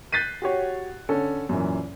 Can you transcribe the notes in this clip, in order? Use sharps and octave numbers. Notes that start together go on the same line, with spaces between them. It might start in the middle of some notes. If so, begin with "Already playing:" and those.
F#6 G6 A6 B6 C7 D#7
F#4 G4 C#5
D3 C#4 A4
F#2 A#2 E3